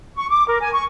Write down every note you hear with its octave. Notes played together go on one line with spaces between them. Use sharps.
C#6
D6
A#4
G#5
C#6